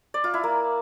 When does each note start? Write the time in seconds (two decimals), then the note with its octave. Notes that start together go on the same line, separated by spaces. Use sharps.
0.14 D5
0.24 F4
0.34 E4
0.43 A#3